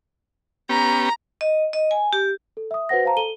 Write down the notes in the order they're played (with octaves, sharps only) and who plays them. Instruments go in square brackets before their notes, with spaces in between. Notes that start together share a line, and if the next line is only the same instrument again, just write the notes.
[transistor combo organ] B3 C#4 G4 [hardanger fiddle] A#5
[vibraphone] D#5
D#5
G#5
G4
[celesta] A4
E5 D#6
F#4 B4 C5 F#5 A#6
C5 F5 A5 A#5
A4 D#7 G7